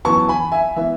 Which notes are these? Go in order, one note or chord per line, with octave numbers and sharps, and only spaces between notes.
F#2 E3 B3 A5 C#6
G#5 B5
E5 G#5
E3 B3 E5